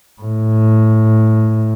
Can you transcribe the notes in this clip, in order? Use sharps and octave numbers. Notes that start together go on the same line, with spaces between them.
A2